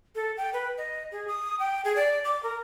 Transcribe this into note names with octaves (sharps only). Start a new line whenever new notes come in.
A4
G5
B4
D#5
G#4
D#6
G5
G#4
D5
D6
A#4